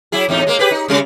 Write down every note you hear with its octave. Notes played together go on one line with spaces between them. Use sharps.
F#3 E4 G#4
E2 A2 D#4
G#3 A#3
G4 G#4 B4
D#4
C#3 G3 C#4